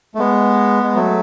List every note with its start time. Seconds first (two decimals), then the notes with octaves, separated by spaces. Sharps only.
0.15 A3
0.19 G#3 B3
0.83 G#3
0.95 F#3 A3